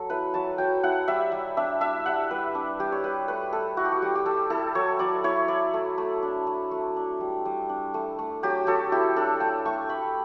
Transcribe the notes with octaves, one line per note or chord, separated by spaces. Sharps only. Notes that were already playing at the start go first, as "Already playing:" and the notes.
Already playing: F#3 A4
E4 B4
F#3 A5
F#3 G5
E4 F#5
G3 E5
G3
D4 E5
D4 E5
G3 F#5
G3 B4
D4
G3 G4
C#5
G3 B4
A3 B4
A3 A4
E4 F#4
G4
F#4
G3 G4
G4
G3 A4
E4 A4
F#3 C#5
F#3 D5
E4 C#5
E4 D5
A3
A3
D4
A3
A3
D4
G3
G3
D4
A3
A3
F#3 G4
F#3 A4
E4 G4
D4 A4
A3 G5
A3 C#6
A3 B5